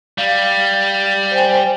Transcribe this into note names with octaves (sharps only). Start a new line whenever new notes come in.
G3 F5
C5 G5 G#5